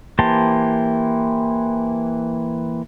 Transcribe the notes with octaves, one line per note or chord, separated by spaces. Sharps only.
E3 A#3 G4 C5 A5